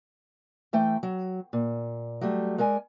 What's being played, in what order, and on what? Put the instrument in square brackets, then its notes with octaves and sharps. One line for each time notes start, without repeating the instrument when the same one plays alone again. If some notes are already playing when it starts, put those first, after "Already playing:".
[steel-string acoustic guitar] E3 A3 G5
F#3
A#2
F#3 G3 A3
G#3 A#4 D5 G#5